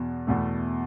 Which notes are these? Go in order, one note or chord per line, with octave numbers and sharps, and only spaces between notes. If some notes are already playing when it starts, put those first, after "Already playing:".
Already playing: E2 B2
E2 B2 A3